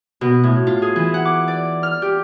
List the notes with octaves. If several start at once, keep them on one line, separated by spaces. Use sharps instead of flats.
B2
A2
F4
G#4
E3
F#5
D6
D5
F6
G4